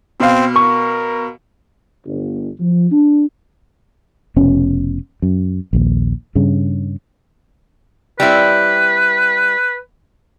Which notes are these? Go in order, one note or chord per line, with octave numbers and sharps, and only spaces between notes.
B2 C4 F5
A#4 C#6
G1
F3
D4
F1 B2 C#4
F#2
A#1 D#2
G2 C#3
G3 C4 E4 B4